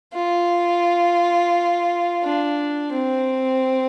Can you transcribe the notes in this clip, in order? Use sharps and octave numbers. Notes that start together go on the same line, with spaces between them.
F4
D4
C4